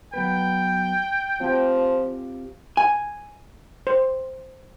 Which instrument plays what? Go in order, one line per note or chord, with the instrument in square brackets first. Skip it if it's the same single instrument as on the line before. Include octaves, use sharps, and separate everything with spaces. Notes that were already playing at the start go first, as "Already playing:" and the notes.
[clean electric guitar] F#3 B3 B4 [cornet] G5
[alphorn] F3 [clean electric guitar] C4 F4 G4
[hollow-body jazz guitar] G#5
[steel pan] C5